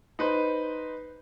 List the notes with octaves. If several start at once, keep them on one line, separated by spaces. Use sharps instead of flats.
D#4 B4 C5